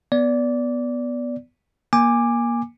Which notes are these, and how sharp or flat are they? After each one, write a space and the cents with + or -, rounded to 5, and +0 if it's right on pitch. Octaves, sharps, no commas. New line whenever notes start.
B3 -5 D5 -15
A#3 +20 G#5 -15 D6 +10